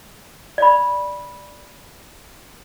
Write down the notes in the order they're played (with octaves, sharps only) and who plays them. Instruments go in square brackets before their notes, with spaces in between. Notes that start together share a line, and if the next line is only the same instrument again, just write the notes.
[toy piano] D5 B5